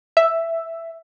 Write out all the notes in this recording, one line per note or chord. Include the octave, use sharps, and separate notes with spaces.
E5